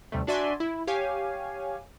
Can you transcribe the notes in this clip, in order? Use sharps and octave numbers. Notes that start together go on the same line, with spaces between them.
D#2 C3 G3 A3
D4 F#4 D5 E5 G#5 C6
E4
G4 C#5 F5 G#5